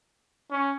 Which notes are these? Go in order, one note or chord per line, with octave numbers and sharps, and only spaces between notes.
C#4